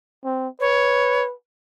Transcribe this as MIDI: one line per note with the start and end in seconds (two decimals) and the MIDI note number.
0.25 0.48 60
0.60 1.33 71
0.60 1.23 73